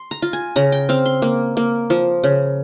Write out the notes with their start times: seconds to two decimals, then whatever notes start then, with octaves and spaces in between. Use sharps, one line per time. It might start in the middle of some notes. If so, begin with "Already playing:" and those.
Already playing: C6
0.11 A#5
0.22 F4
0.33 G#5
0.56 C#3 A#5
0.72 G5
0.89 C4 F5
1.06 C6
1.22 A#3
1.57 A#3
1.90 F3
2.24 C#3